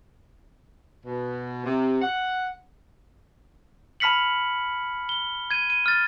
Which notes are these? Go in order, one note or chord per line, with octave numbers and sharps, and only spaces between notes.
B2
C3
F#5
A5 B5 F6 B6 C#7 F#7
G7
G#6 D#7
D#7
F6 A6